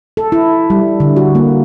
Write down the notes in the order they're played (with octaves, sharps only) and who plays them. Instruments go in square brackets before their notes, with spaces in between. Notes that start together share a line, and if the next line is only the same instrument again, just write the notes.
[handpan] A4
E4
G3
D3
F#4
A#3